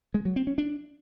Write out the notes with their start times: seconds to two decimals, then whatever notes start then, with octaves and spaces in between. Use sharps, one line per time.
0.14 G#3
0.25 F#3
0.36 C4
0.47 C#4
0.58 D4